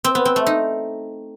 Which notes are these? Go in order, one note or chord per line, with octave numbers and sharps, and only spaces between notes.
C4
B3
C4
A3
D#4